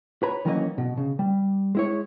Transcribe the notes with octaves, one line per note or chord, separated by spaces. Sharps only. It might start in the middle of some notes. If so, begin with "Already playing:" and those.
B4 C#5 A#5 B5
D#3 E3 F#3 A#3 C#4 D#5
B2
C#3
G3
G#3 E4 C#5